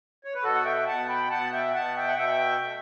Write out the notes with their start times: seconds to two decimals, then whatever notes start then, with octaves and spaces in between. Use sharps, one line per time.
0.24 C#5
0.34 B4
0.43 B2 F#4 A4
0.54 F#5
0.65 E5 G5
0.87 B2 F#5 A5
1.09 G5 B5
1.30 B2 F#5 A5
1.52 E5 G5
1.74 B2 F#5 A5
1.96 E5 G5
2.08 F#5
2.18 B2 E5 G5
2.62 A3